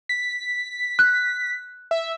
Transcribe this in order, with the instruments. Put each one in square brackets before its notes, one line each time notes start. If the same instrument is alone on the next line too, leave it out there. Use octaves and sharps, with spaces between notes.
[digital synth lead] B6
[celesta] F#6
[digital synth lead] E5